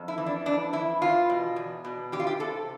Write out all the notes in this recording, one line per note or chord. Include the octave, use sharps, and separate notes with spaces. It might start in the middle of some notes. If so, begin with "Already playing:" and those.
Already playing: F2
E4
E3
D4
F2 D4
E3 E4
E2 F4
B2
E2
B2
E2 G4
F4
G4
C3 A4